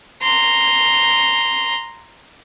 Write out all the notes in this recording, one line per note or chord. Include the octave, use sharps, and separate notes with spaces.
A#5 C6